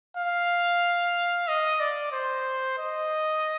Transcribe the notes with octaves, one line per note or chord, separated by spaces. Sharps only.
F5
D#5
D5
C5
D#5